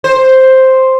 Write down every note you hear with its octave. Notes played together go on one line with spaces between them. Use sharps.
C5